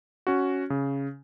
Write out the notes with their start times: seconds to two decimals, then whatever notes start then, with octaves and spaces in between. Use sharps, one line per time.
0.27 C#4 F#4
0.70 C#3